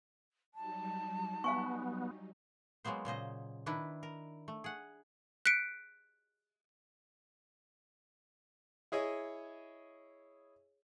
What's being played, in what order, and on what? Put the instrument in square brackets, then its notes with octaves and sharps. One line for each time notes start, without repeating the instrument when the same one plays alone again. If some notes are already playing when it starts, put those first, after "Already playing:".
[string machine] F#3 G3 D#4 [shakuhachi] A5
[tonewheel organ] B3 [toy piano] F5 G#5 C#6
[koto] F#3 G#3 A#3 B3 C5
A#2 C#3 C5 D#5
D#3 D4 E4 B4
A#4
A3
G#4 F#5
[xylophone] F#6 B6 C#7 D7
[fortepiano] E4 G#4 C#5 D#5